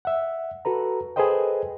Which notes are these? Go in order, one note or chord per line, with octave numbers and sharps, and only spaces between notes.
E5 F#5
F#4 A4 B4 A#5
G#4 A4 B4 C5 D#5 G5